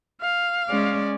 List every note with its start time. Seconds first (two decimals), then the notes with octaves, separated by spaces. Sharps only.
0.21 F5
0.69 G#3 C#4 D5